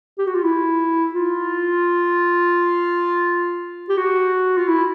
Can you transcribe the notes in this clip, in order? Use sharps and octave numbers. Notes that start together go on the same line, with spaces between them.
G4
F#4
F4
E4
F4
G4
F#4
F4
E4